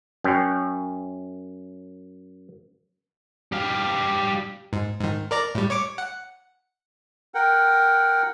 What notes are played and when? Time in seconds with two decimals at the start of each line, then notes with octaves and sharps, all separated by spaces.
0.24 F#2 C#4 G5
3.52 G3 F5
4.73 G#2
5.00 G#2 D#3
5.31 A#4 D5 A#5
5.55 A2 G3
5.70 C#5 C#6 D6
5.98 F#5
7.34 A#4 F#5 G5